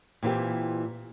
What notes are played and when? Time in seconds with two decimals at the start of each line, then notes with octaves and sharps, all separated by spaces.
0.23 A#2 E3 C4 G4